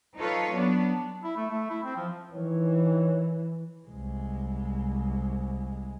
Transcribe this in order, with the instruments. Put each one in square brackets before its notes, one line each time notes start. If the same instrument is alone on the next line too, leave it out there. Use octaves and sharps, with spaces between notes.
[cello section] D#4 F4 A4 B4 C#5
F#3 B3 D4
[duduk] E4
A3
A3
E4
C4
F3
[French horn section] D#3 C#5 [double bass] E3
[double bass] C2 G#3